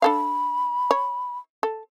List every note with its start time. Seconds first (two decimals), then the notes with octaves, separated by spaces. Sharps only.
0.02 D4 A4 F5 B5
0.91 C#5
1.63 A4